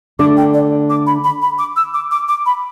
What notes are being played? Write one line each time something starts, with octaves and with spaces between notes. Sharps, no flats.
D3 A3 D4 D6
G5
D5
D6
B5
B5
B5
D6
E6
D6
D6
D6
B5